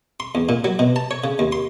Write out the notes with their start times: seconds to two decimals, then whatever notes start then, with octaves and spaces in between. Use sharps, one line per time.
0.20 C6
0.35 E2
0.49 A#2
0.64 F#3
0.79 B2
0.96 A5
1.11 C#5
1.24 C#3
1.39 D#2
1.52 C6